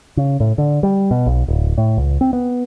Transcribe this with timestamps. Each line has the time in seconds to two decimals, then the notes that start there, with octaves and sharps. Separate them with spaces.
0.17 C#3
0.40 A2
0.58 D3
0.83 G3
1.11 B2
1.26 B1
1.48 D1
1.78 A2
1.97 C#2
2.21 C4
2.33 B3